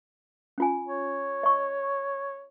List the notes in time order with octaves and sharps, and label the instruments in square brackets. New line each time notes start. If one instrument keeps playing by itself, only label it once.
[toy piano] C#4 F4 G#5
[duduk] C#5
[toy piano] D#5 C#6